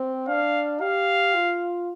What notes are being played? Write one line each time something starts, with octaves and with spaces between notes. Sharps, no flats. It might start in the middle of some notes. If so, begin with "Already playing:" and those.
Already playing: C4
D4 F5
G4 F5
F4